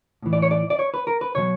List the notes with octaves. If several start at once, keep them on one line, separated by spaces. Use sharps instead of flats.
A2 E3
D5
C#5
D5
D5
C#5
B4
A#4
B4
B2 F#3 C#5